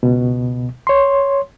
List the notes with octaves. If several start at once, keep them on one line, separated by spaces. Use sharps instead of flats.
C#2 B2
C#5 C6